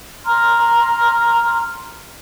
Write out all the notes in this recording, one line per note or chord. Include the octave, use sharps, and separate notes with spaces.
A#5 C6 F6